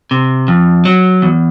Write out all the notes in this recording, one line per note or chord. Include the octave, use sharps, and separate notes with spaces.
C3
F2
F#3
E2